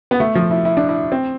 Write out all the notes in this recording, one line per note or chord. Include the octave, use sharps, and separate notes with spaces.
B3
A3
F3
E4
E4
D4
E4
C4